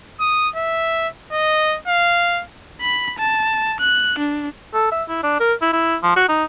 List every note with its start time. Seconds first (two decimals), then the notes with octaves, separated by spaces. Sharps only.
0.20 D#6
0.56 E5
1.32 D#5
1.88 F5
2.81 B5
3.18 A5
3.80 F#6
4.19 D4
4.74 A4
4.92 E5
5.09 E4
5.23 D4
5.40 A#4
5.62 E4
5.73 E4
6.03 F3
6.16 F#4
6.29 D#4